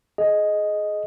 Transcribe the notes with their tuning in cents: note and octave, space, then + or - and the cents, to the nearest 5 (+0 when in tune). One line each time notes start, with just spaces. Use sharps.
G#4 +25 D#5 +0